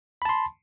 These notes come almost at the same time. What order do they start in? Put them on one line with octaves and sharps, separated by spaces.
B5 A5 C6